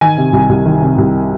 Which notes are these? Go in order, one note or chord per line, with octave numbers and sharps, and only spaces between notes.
D#3 G#5
C3
C2
C2
D#3
C3
C2